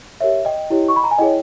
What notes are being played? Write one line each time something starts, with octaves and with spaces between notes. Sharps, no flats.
G4 A#4 C#5 E5
D#5 G5
E4 G4 C#5
C#6
B5
A#5
G#5
E4 G#4 C#5 D#5 G5